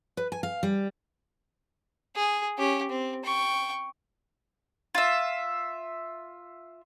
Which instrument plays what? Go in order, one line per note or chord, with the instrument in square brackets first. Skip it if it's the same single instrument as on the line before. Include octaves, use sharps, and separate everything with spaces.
[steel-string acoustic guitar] B4
G#5
F5
G3
[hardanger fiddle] G#4
C#4 G4
C4
G5 C#6
[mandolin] F4 E5